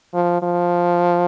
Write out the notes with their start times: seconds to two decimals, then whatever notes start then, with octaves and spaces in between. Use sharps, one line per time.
0.14 F3
0.42 F3